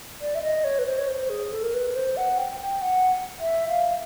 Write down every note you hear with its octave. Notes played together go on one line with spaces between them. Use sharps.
D5
E5
D#5
C#5
B4
C5
C#5
C5
G#4
A4
A#4
B4
C5
F#5
G5
G5
F#5
E5
F5